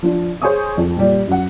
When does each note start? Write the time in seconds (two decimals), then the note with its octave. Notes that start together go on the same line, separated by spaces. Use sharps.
0.03 F3 D4
0.42 G#4 C5 C#5 G#5 C#6 D#6
0.77 F2
0.97 A#2 G3
1.27 F#2 F#5